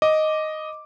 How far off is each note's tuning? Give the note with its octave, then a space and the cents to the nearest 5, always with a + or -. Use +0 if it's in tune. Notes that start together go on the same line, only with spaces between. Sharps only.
D#5 +0 D6 +0